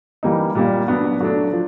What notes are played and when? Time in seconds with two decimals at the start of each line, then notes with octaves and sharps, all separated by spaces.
0.23 E3 G3 A#3 D#4
0.55 A#2 G3 A#3
0.88 F#3 B3 D4
1.20 F#3 A3 D4
1.53 F3